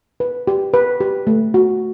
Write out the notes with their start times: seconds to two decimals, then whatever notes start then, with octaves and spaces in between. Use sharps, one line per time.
0.20 B4
0.47 G4
0.74 B4
1.00 G4
1.27 A3
1.54 F#4